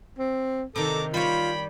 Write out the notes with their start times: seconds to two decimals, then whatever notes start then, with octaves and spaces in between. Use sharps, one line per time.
0.19 C4
0.76 C3 D#3 D4 A4 A#5 D6
1.14 G3 F4 C#5 G5 B5